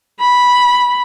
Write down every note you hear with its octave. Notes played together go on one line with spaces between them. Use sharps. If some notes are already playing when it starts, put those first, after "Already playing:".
B5